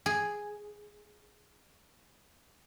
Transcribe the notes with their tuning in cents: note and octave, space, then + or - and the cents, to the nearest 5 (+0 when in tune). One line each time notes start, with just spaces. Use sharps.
G#4 +0